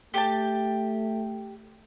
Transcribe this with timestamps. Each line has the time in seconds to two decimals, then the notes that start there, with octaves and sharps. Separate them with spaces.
0.14 A3 G4 G5 A5